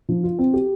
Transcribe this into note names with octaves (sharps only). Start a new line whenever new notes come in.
F3
F4
C4
G4